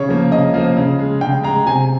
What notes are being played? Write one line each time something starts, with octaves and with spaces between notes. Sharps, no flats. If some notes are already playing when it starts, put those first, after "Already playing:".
Already playing: C#3 C#5
F3 A#3
C#3 D#5
F3 A#3
C#3
G#3
C#3 G5
G#3 A#5
C3 G#5